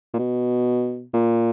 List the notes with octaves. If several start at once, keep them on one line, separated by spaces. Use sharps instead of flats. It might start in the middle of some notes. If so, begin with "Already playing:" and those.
A#2
B2
A#2